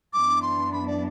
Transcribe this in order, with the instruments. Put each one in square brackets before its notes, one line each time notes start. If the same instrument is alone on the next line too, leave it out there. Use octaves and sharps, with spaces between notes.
[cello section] F#2 E3 B3 D4 [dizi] D6
[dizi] C6
B5
D5